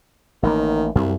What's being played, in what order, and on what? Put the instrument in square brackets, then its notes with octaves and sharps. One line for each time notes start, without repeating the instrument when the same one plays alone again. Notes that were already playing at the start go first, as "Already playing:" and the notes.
[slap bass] A1 A#3 [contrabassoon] D#3
[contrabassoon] C2 [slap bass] F#2